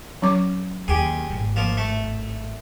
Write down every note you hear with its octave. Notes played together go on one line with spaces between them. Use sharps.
F#3 C#4 D6
D#2 G4 G#4
G#1 A2
F3 A#3
A3